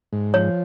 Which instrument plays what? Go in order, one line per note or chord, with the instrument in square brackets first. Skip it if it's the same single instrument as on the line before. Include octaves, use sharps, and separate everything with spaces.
[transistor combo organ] G#2
[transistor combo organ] F3 [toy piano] C#5